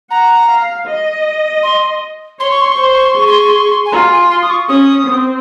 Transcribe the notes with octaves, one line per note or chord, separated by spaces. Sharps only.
F#5 A#5
F5
D#5
C6
C#5 C6
C#6
C6
C#6
C5
C6
C#6
C6
G#4 C#6
C6
C#6
C6
C#6
C6
G#5
F4 A#5
G#5
C6
D#6
C#6
C#4 D#6
C4